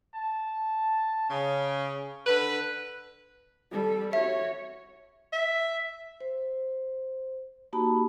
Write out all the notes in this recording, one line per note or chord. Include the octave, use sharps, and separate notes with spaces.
A5
C#3 C#4
D3 B4
G3 A4
F#4 C#5 E5
E5
C5
A#3 D#4 F#4 G4 A5 B5